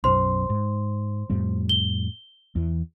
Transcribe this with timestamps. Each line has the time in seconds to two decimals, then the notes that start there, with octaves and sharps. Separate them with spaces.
0.04 B1 F#2 C5 C6
0.50 G#2
1.30 F2 A2 G3
1.69 G7
2.55 E2 E3